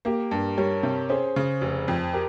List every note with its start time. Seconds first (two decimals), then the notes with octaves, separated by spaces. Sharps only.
0.05 A#3 G4 A#4
0.31 G2
0.58 G3 A#4 C#5
0.83 C3
1.09 C#4 G#4 C5
1.36 C#3
1.61 F1
1.88 F2
2.13 G4 A#4